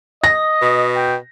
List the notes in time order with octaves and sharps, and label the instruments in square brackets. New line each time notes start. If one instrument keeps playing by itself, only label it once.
[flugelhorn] D#5 [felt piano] A#6
[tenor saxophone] B2
[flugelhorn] G5